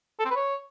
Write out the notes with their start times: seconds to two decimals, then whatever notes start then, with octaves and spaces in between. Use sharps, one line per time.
0.20 A4
0.25 C4
0.31 B4
0.36 C#5